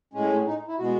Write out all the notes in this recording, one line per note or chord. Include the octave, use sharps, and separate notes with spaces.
A2 G#3 C#4
D#4
E4
B2 G#3 B3 F#4